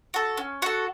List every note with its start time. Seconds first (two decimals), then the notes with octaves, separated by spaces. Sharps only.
0.14 F#4 A4
0.37 C#4
0.62 F#4 A4